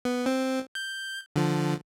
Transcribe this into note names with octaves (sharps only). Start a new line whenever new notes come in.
B3
C4
G6
D3 F3